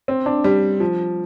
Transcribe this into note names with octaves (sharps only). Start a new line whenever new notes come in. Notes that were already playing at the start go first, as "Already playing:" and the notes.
C4
D4
G3
F3